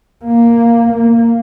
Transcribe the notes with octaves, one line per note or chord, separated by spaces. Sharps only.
A#3
A#3